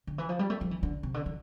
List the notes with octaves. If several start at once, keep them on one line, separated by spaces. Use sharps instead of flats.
D3
E3
F3
G3
A3
F3
E3
D3
C3
D3
E3